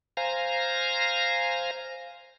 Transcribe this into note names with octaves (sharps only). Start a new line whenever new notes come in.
C5 F5 G#5 A#5 A#6